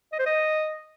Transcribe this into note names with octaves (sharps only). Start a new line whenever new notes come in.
D#5
C5
D#5